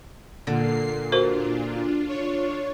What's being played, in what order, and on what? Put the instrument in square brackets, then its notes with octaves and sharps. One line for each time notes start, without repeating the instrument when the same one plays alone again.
[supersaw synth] A#2 [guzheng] D3 [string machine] A#3 C7
[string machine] D4 F4 [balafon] F#4 A#4 C5
[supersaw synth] C#5